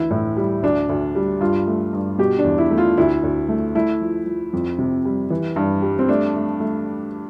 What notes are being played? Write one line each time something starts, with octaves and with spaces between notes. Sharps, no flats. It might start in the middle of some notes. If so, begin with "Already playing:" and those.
Already playing: D2 E3 E4
A2
G3
D2 D4
D2
G3
G2 F4
A3
G2
B2 G4
D4
E2
E4
A3
F4
D2 E4
D2
A3
A3 E4
F3
F3
F2
C3
G3
E3
G2
G3
C4
A3 D4
A3
A3